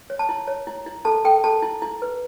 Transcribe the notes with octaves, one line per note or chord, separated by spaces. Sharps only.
C#5
A5
E4
C#5
E4
E4
A4 A5
A4 G5
A4 A5
E4
E4
B4